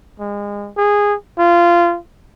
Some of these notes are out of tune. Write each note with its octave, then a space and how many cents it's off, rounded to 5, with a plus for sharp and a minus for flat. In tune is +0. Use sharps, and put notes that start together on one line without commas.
G#3 -30
G#4 -15
F4 -20